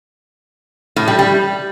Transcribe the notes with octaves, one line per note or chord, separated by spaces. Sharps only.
A2
G3
G3